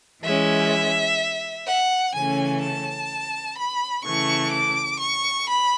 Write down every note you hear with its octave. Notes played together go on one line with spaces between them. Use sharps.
E3 G#3 C#4 E5
F#5
C#3 E3 A3 C#4 G#5
A5
B5
C#3 E3 A3 C#6
D6
C#6
B5